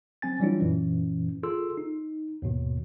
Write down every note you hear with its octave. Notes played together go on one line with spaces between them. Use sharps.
F#3 C4 G#5 A6
E3 F#3 G3 D4 E4 F4
F#2 A#2 E3 C#4
F4 G#4 A4 C6 E6
D#4
D#2 G#2 B2 D#3